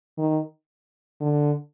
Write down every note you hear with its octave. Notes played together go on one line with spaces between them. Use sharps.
D#3
D3